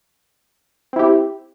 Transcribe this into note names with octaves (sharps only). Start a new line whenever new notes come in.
C4 E4 G4